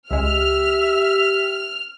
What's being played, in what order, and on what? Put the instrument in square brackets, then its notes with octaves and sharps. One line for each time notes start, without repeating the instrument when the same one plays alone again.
[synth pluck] C#2 G#3 [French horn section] G4 [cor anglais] E5 [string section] F6